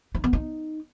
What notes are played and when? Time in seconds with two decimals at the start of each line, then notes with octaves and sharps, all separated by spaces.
0.15 D#4
0.24 B3
0.33 D#4